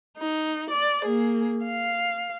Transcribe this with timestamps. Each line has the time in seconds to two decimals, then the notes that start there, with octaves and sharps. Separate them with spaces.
0.18 D#4
0.70 D5
1.05 A#3 G#4
1.65 F5